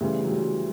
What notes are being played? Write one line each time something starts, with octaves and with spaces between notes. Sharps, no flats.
D2 C#3 E3 G3
F#3
G3